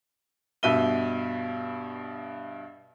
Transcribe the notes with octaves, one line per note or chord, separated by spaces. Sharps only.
G2 B2 E5 D#7 G7